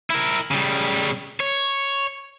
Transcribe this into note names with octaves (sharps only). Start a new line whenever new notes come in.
E4 A#4
C#3 G3
C#5